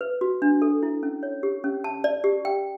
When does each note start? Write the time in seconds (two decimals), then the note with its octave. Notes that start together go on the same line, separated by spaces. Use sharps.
0.01 B4
0.21 F#4
0.42 D4
0.62 A4
0.83 E4
1.03 C#4
1.23 C#5
1.43 G4
1.64 C#4
1.84 A5
2.04 D5
2.24 G4
2.45 G5